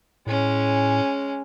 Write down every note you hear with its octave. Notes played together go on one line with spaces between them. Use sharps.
A2 G#3 C#4